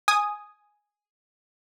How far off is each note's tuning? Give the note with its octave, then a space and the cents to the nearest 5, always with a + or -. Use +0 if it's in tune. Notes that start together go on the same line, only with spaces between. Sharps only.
G#5 +0 D#6 +0